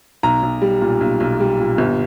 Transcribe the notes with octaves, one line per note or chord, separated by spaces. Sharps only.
B1 A#5
B1
G3
A#2
B1
B1
G3
A#2
G1